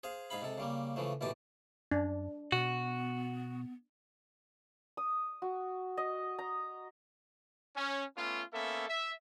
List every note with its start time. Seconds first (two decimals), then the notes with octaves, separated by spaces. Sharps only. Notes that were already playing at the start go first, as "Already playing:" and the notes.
0.03 G#4 C5 F5
0.30 G#2 G#4 F5 B5
0.42 C3 G#3 A4
0.58 C#3 G3 A#3
0.96 C#3 E3 F3 A3
1.21 A1 B2 D#3 E3 G4 A5
1.91 F#2 D4
2.52 B2 B3 F#4
4.97 D#6
5.42 F#4
5.97 D#5
6.39 A#5
7.76 C#4
8.17 A3 B3 C#4 F4
8.54 A#3 B3 C#4 A4 E5
8.89 E5